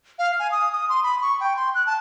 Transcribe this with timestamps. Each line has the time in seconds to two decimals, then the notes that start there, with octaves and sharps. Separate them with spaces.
0.19 F5
0.39 G#5
0.51 D#6
0.72 D#6
0.89 C6
1.03 B5
1.22 C#6
1.40 G5
1.57 C6
1.75 F#6
1.87 A5